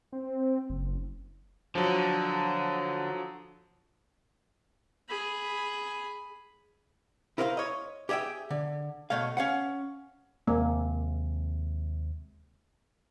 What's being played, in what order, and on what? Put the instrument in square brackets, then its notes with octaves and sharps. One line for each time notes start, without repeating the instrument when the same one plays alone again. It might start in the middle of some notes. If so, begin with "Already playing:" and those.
[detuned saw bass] C4
F#1
[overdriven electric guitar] D3 [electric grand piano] F3 F#3
[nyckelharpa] G#4 B5
[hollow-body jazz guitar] E4 A#4 C5 D5 F5
C#5 D#5
G4 G#4 D#5 E5 G5
D3
B2 A3 C#5 F5
C#4 F5 F#5
[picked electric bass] D#2 C3 G#3 [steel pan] A#3